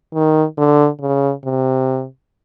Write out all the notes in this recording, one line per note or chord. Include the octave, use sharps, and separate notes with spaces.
D#3
D3
C#3
C3